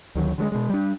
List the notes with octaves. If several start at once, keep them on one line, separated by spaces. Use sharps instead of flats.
D2 D#3 F#3
D3 F#3 G#3
B2 G#3
G3 D4